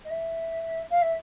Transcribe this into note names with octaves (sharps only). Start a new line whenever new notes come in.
D#5
E5
F5
E5